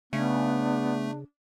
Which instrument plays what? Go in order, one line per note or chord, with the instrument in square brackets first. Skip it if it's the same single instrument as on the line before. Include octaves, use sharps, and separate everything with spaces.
[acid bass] C#3 [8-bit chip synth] A3 [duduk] B3 [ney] D4